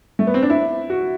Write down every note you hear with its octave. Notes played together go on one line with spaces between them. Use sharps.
A3
B3
C4
D4
E4
F#4